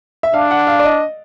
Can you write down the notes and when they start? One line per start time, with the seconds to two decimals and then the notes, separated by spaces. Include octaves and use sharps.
0.23 E5
0.34 D4 F5
0.51 F#5
0.67 F5
0.80 D5
0.84 D#5